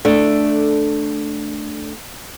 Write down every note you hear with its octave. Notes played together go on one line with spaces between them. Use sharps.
A3 D4